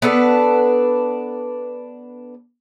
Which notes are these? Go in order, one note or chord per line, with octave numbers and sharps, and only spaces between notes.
B3 D4 A4 B4